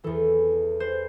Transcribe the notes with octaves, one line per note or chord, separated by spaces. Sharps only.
E2 E3 A4
C5